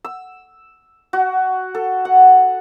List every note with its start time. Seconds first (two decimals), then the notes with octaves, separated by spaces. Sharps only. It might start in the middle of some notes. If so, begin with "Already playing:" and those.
0.05 E6
1.13 F#4
1.75 A4
2.05 F#5